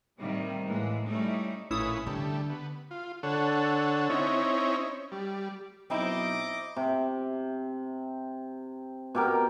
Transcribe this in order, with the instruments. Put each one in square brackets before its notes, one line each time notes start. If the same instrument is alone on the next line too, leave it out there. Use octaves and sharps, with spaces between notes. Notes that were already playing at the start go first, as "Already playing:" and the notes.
[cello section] A2 C3 D#3 G3 A#3
A2 E3 G#3 A#3
G3 A3 C#4 D#4 E4
[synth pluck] A1 E4 D#6 [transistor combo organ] A#2 C#4 B4
[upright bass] D3 [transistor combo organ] G3 A3
[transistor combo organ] B3
F4
D3 A4 C#5 F#5
C4 C#4 D#4 E4 C#5
G3
[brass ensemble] B1 [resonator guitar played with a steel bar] C4 D#4 E4 [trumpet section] D#5 D6
[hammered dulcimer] C3
B2 G4 A#4